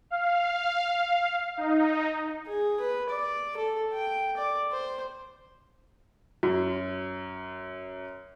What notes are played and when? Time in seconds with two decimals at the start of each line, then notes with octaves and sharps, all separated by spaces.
0.10 F5
1.57 D#4
2.47 G#4
2.80 B4
3.09 D5
3.57 A4
3.92 G5
4.37 D5
4.71 C5
6.43 F#2 F#4